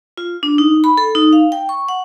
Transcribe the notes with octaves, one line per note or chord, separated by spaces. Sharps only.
F4
D4
D#4
B5
A4
D#4
F5
G5
C#6
F#5